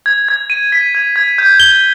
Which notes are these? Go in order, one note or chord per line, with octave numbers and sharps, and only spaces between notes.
G#6
G#6
D#7
B6
G#6
G#6
G6
G7